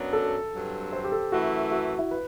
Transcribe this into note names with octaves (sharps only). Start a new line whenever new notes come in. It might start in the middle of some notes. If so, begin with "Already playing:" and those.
Already playing: F#2 F#3 B3 D4
A4
G2 F#3 C4
C5
G4
A4
F#2 E3 A3 E4 F#4
F#4
E4
B4